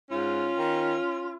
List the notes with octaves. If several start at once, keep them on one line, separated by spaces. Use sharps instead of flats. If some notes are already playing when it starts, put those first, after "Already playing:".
G#2 C#4 F4
D#3